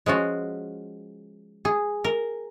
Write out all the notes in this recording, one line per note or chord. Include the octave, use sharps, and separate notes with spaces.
F3 G#3 C#4 F4 F#4
G#4
A#4